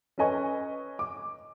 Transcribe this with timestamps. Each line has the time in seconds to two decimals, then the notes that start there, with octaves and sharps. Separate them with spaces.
0.18 C#4 A4 B4 D#5 G#5 C#6
0.99 D6